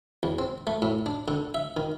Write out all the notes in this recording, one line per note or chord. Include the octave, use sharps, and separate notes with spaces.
E2
C4
A3
A2
D4
D3
E5
D#3